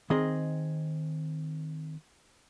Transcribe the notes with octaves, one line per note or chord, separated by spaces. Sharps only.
D#3 C4 G#4 D#5